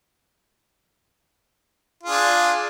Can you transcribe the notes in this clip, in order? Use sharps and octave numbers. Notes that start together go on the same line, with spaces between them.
D4 F4 G#4